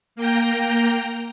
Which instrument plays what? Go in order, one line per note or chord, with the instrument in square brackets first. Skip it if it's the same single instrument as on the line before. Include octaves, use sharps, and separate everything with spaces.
[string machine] A#3 G5 A#5